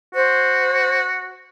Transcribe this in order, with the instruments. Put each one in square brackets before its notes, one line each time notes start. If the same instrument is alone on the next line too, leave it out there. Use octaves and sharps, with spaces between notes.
[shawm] F#4 [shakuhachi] C5